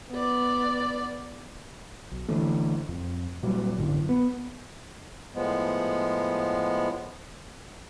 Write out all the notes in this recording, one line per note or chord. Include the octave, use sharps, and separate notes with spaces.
B3 D5
B1
D3 E3 A3
F2
A#2 F#3 G3
A1 F#2 D3
B3
A2 F3 G#3 B3